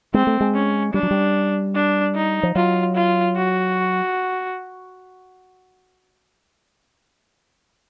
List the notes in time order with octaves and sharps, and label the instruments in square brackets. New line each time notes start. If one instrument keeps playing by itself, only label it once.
[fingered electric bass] G#3 [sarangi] C4
[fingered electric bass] A3
G#3
[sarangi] C#4
[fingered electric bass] G3 [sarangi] D4
[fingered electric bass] F#3
G3
[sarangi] D4
D#4
[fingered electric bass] F3
[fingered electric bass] F#3 [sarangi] F4
[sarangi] F4
F#4